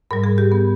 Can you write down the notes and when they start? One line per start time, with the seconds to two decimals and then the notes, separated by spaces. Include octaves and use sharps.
0.11 G#2 G3 A#4
0.24 G#4
0.38 G4
0.52 B3